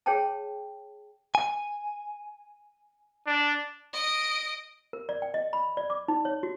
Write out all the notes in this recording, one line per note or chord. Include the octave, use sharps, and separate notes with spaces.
G#4 C#5 G5 A5
G#5
D4
D#5 D7
A#4
D5
G5
D#5
B5
D5
D6
D#4
C#5
F#4